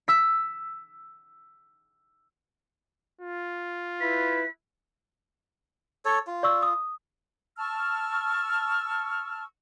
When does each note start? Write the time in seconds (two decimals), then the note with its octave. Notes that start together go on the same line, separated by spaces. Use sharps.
0.08 E6 B6
3.21 F4
4.00 E4 B4 B6
6.05 A4 C#5
6.27 F4
6.43 D5 C#6 E6
6.62 D#6
7.57 A5 C#6 E6 F6